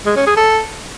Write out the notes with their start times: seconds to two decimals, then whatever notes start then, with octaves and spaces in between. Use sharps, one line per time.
0.06 G#3
0.16 C#4
0.27 G#4
0.37 A4